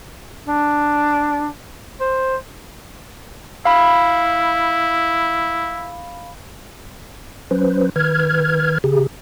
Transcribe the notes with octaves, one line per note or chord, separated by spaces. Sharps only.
D4
C5
E4 F5 B5
F#3 C#4 B4 C5
D#3 B4 F6 G#6
C#3 G4 G#4